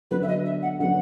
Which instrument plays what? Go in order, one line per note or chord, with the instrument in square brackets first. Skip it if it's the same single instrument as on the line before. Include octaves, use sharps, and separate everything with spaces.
[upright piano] D3 F#3 B3 [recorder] B4
[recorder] E5
D#5
E5
F#5
[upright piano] D3 F#3 B3 [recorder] F#5